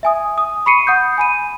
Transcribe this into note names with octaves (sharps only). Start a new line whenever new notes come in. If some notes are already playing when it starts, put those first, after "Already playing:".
E5 G#5 D#6
D#6
B5 C#6 C7 C#7 D#7
F#5 D#6 G6
G#5 B5 D#7